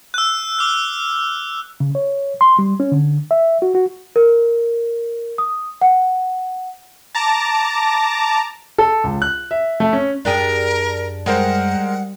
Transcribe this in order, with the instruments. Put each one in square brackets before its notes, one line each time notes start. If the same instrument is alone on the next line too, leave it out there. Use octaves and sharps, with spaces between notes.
[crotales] E6 F#6
D6 F6
[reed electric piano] C#3
C#5
C6
G3
C#4
D3
E5
F#4
F#4
[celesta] A#4
D#6
F#5
[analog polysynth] A5 A#5 D6
[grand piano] A4
C#2
F#6
E5
A3
C#4
[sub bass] F#2 [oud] D4 G4 G#4 [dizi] A#4
[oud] G3 [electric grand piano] G#3 A#4 C5 [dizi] F#5